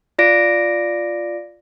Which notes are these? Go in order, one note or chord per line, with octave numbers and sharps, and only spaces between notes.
F4 D5 A#6 D7